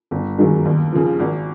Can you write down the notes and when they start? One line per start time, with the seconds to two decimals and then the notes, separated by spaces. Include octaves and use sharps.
0.11 G1
0.38 F#2 D#3 G#3
0.65 D#2
0.92 C#3 F3
1.20 G#1